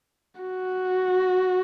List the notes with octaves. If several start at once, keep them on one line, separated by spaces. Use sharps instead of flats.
F#4